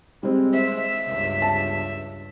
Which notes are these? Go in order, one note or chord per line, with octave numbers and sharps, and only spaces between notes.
G3 G#3 C4
C5 E5
C#2 G2
A5